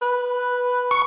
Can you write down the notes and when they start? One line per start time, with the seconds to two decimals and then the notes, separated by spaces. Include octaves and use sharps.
0.02 B4
0.91 C#6